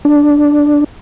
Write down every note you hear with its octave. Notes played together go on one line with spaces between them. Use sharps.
D4